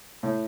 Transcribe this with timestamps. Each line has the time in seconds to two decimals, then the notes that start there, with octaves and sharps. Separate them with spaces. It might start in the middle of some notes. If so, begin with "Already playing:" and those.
0.23 A2